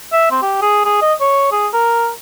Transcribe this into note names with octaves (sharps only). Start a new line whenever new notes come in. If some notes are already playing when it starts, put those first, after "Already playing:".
E5
C4
G4
G#4
G#4
D#5
C#5
G#4
A#4